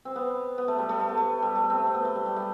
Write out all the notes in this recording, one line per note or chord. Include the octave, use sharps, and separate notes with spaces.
C4
B3
B3
A3
G3
A3
A3
B3
A3
G3
A3
C4
A3
B3
A3
G3
G3
A3